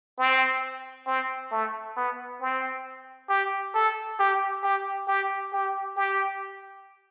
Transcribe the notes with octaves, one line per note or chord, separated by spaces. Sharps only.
C4
C4
A3
B3
C4
G4
A4
G4
G4
G4
G4
G4